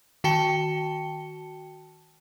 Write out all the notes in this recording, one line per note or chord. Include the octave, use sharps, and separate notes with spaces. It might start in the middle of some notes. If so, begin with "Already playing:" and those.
D#3 F#4 G5 A5 C#7 G7